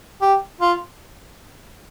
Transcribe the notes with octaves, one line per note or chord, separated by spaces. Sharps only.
G4
F4